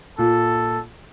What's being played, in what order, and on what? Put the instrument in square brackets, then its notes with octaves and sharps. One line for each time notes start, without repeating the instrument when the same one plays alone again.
[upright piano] A#2 [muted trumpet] A4